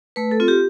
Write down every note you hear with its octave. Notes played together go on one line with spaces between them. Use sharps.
A3 B4
A4
C4 F4
G4